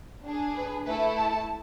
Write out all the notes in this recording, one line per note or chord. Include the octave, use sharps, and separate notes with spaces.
D4 G#4
B4
A3 E4 A4 B4
A5